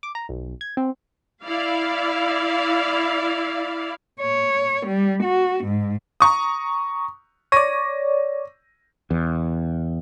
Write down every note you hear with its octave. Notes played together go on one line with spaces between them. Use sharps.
D6
A#5
B1
G#6
C4
E4 D5 F5
C#5
G3
F#4
G#2
A#5 C#6 D#6
C#5 D5 A#6 D#7
E2